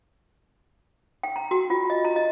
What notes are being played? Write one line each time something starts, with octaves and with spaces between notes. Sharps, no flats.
G5
A#5
F#4
F4
D#5
A#5
D#5